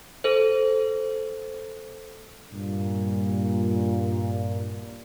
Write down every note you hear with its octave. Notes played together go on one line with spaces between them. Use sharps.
A4 C5
G2 A#2